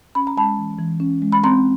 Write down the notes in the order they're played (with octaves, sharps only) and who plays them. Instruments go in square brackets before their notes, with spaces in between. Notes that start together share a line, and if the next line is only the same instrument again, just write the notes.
[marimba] C#4 B5
A#5
G#3 A5 B5
E3
E3
C#4
G#3
B5
C4 A#5 C6